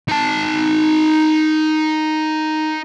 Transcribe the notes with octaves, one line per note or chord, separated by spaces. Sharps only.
D#4 A5